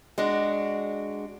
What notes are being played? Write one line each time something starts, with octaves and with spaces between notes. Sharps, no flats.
G#3 D4 F#4